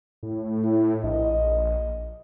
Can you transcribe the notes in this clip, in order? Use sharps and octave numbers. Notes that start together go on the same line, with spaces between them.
A2
E4
A#1 D#5